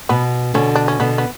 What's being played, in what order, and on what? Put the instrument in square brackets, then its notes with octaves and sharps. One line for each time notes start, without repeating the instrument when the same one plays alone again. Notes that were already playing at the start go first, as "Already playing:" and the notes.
[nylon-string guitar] B2 [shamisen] B3
[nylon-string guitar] B2 D3 [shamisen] C#4
[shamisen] D4
C#4
[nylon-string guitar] B2 D3 [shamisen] B3
[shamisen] B3